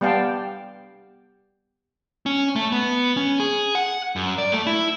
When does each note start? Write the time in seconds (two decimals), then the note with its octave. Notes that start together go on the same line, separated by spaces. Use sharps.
0.01 G3 B3 D5 F5 G5 A5
2.26 C#4
2.56 A3
2.72 B3
3.16 C#4
3.40 G#4
3.75 F#5
4.16 F#2
4.38 D5
4.52 A3
4.67 E4